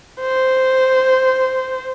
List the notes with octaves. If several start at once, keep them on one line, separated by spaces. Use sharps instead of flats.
C5